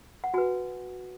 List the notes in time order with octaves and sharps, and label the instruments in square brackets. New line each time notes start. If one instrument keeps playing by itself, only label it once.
[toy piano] F#5
F#4 B4 G#5